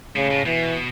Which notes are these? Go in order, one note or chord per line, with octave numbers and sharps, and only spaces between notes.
A2 C#3
A2
B2 E3